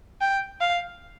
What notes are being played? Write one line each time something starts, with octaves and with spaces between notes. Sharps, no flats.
G5
F5